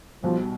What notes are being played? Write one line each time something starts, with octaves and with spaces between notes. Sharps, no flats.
B1 B2 F3 G3